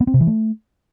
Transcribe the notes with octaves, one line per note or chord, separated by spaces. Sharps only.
B3
C4
C3
E3
A3